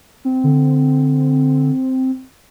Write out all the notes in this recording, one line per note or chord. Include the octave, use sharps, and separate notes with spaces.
C4
D3